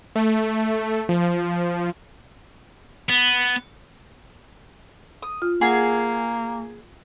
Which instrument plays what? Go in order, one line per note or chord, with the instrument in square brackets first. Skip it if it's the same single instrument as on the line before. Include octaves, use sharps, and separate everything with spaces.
[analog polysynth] A3
F3
[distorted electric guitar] B3
[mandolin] D#6
[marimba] F4
[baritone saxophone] A#3 [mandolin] G#4 [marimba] F#5